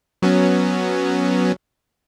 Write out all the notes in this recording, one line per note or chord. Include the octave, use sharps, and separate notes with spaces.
F#3 B3 C#4